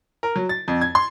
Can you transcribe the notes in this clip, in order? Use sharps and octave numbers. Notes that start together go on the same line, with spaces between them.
A#4
F#3
A6
F2
G#6
C6